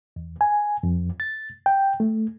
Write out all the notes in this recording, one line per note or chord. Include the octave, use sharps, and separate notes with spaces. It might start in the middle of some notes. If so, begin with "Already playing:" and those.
E2
G#5
F2
A6
G5
A3